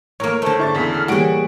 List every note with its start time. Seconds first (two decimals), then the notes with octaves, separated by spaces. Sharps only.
0.20 A2 A#3 A#4 C#5
0.42 D3 A3 C5
0.59 G#2 D4 E4 C#6 A6
0.75 E2 C#3 A4 B6
0.92 F6
1.08 A2 E3 G3 A#3 F#4 G#4 F#5 D7